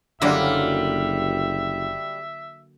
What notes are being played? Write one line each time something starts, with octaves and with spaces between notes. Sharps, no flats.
F#1 D3 F#3 G3 A#3 F4 E5